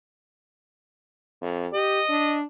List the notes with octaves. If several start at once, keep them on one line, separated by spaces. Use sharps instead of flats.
F2
G4 D#5
D4